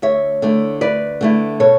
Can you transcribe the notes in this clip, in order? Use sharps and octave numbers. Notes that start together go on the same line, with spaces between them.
D2 C#5 E5
D3 A3 E4
D2 B4 D5
D3 A3 E4
B2 A4 C#5